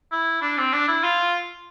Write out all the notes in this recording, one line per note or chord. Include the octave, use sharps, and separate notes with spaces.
E4
D4
C4
D4
E4
F4